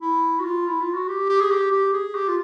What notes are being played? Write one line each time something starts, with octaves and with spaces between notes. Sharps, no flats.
E4
F#4
F4
E4
F4
F#4
G4
G4
G#4
G4
G4
G#4
G4
F4